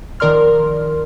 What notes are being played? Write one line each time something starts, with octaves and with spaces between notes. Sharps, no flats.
D#3 F3 A#4 D5 C6 F6